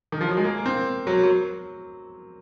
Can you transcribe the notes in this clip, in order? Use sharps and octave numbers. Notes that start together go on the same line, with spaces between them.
D#3
F3
F#3
G#3
A#3
A#3
C4
F#3
F#3